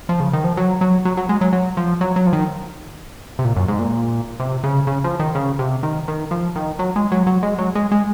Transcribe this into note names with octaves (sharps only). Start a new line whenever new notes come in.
F3
C#3
D#3
F3
F#3
F#3
F#3
F#3
G#3
F#3
F#3
F3
F#3
F#3
F3
D#3
C3
A#2
F#2
G#2
A#2
C3
C#3
C#3
F3
D#3
C#3
C3
D#3
D#3
F3
D#3
F#3
G#3
F#3
F#3
G#3
F#3
G#3
G#3